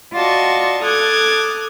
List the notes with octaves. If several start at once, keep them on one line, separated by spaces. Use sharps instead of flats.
F4 F#4 D5 D#5 A5 C#6
A4 D6 D#6 F6 F#6 G#6